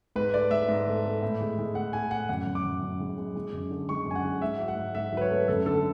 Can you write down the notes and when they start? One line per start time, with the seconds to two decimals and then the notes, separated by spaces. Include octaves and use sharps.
0.16 G#2 B4
0.33 A3 D5
0.51 G#2 E5
0.69 G#2
0.87 A3
1.05 A3
1.22 A2
1.41 G#3
1.58 G#3
1.75 A2 F#5
1.93 G#3 G#5
2.11 A2 F#5
2.29 F#2 F#5
2.47 F#2
2.55 D6
2.65 F#2
2.83 F#2
3.00 G#3
3.18 G#3
3.35 G#3
3.52 F#2
3.71 D3
3.89 G#3 C#6
4.06 F#2 G#5
4.15 F#5
4.24 G#3
4.41 G#2 E5
4.60 F#3
4.68 F#5
4.77 G#2
4.95 G#2 E5
5.12 F#3 B4
5.21 C#5
5.30 A3
5.48 F#2 A4
5.66 D3 A4